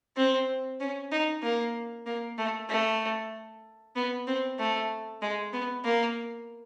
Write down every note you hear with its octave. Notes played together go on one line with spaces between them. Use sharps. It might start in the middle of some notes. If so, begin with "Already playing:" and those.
C4
C#4
D#4
A#3
A#3
A3
A3
B3
C4
A3
G#3
B3
A#3